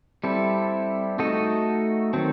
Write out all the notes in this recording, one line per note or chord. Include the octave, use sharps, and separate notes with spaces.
G3 C4 E4 A4
A3 D#4 F#4 A4 D#5
D#3 F#3 C4